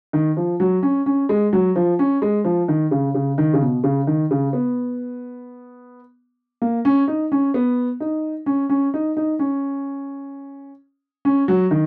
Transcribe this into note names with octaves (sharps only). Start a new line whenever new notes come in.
D#3
F3
F#3
C#4
C#4
G#3
F#3
F3
C#4
G#3
F3
D#3
C#3
C#3
D#3
C#3
B2
C#3
D#3
C#3
B3
A#3
C#4
D#4
C#4
B3
D#4
C#4
C#4
D#4
D#4
C#4
C#4
F#3
D#3